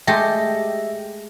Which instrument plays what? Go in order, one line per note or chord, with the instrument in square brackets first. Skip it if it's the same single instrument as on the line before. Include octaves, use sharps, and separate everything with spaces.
[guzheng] G#3 A3 G4 [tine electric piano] E5 A#6